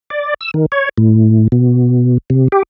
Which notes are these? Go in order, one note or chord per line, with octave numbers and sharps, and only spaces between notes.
D5
E6
D#3
C#5
A2
B2
C3
G4